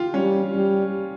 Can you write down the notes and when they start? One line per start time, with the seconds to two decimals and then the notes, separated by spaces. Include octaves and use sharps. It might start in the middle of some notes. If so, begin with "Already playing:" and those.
Already playing: F4 G4
0.14 G3 C#4
0.55 G3